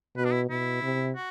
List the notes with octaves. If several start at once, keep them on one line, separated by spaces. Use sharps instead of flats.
B2 B4
D4
E4
B2 E4
C3
F#4